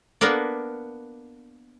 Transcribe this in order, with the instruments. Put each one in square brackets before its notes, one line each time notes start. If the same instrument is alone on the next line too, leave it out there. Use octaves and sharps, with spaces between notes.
[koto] A#3 B3 D4 A#4 B4 D5